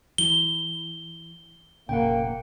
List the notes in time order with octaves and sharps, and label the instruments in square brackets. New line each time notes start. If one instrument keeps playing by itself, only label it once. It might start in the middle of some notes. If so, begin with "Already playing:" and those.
[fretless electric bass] E3 [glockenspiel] G7
[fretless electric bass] F1 A#2 C#3 [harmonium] A#3 [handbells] F#5 G5